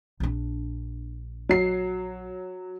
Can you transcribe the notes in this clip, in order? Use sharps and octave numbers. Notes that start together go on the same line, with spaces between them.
A#1 D4
F#3 C7